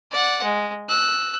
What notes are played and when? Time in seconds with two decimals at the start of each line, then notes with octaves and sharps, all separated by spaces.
0.12 D5 F#5
0.43 G#3
0.89 E6 F#6